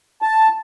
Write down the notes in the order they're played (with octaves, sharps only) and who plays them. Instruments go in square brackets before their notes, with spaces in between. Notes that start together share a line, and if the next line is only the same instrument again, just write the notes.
[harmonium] A5